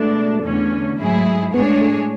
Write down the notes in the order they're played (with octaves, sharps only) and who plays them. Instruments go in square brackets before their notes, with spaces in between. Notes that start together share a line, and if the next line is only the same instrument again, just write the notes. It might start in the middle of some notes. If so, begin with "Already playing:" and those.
Already playing: [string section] B2 G#3 D4 [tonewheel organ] A3
[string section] E2 D3 A3 C#4
G#2 F#3 A3 E4 G#4
[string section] A2 G#3 D4 G#4 C#5 [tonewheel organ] B3
[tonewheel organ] A3